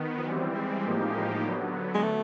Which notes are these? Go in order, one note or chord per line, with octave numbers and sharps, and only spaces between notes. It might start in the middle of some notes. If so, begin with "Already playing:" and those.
Already playing: D#3 B3
F3
E3 F#3 G3 C4
G#3
A2 F3 A#3 D#4 G4
D3 F#3 B3
G#3
A3